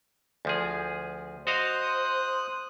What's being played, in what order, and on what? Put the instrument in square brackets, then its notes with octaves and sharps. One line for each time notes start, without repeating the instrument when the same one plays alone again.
[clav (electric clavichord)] D2 F3 G#4
[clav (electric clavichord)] F#4 D#5 F5 [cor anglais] C5 [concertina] D#6 F#6